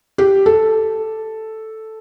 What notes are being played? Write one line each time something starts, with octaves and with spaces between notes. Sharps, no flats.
G4
A4